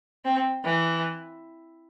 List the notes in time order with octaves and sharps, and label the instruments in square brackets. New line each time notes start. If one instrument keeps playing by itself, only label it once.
[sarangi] C4
E3